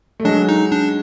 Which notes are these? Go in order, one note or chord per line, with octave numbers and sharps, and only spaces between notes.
A3
F#3 G#3 D4
D#4
D4